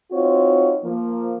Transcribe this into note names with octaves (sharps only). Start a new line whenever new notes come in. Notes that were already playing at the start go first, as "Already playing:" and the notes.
C4 D#4 F4 F#4 C#5
F3 A#3